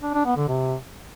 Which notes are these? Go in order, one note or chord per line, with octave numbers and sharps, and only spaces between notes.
D4
D4
B3
D3
C3